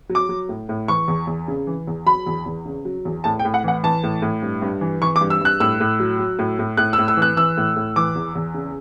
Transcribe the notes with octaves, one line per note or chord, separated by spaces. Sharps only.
F#3
D6
F#3
A2
A2
E3 C#6
E2
E2
C#3
E3
E2
F#3 B5
E2
E2
C#3
F#3
E2
A2 A5
G5
A2
F#5
E3 F#5
E3 A5
A2
A2
G2
G2
E3
E3 C#6
D6
G2
E6
G2 F#6
A2 E6
A2
F#3
F#3
A2
A2
A2 F#6
E6
A2
E6
E3
F#6
E3 E6
A2
A2
E3 D6
E2
E2
C#3